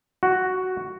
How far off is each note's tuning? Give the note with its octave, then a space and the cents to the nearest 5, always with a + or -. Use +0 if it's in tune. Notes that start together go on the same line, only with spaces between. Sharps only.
F#4 +5